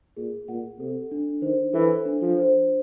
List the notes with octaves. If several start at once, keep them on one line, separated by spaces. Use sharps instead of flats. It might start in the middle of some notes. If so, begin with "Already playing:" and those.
A#2 G#4
A#2 F#5
C3 A4
D4
D#3 C5
E3 A4
D4
F3
C5